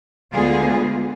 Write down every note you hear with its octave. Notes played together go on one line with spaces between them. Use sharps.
D2 D3 G#3 B3 F4 G#4